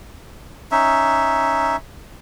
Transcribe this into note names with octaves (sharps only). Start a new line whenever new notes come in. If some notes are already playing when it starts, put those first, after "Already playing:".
C#4 D#4 E5